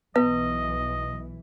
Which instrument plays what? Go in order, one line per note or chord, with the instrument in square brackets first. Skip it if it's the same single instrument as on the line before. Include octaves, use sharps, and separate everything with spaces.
[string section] B1 E3 [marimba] B3 [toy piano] B4 [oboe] D#5